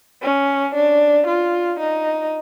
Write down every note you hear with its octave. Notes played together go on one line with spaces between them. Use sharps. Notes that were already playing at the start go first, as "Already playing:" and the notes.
C#4
D4
F4
D#4